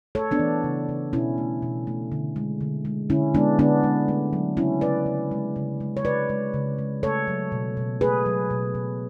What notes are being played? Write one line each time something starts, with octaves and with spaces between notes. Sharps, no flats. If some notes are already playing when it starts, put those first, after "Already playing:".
A3 A4 C#5
B3 D4
E3
C#3
C#3
B2 C#4 E4
A3
B2
A3
D3
G#3
D3
G#3
D3 C#4 E4
G#3 B3 D4
D3 B3 D4
G#3
A3
F#3
C#3 C#4 E4
C#3 B4 D5
C#3
G#3
C#3
G#3
C#5
C#3 B4 D5
G#3
C#3
G#3
A3 A4 C#5
F#3
B2
B2
A3 G#4 B4
F#3
B2
B2